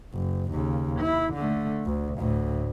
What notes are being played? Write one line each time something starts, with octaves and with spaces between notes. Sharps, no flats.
F#1
D#2 C#3
E4
D3 A3
D2
D2 A2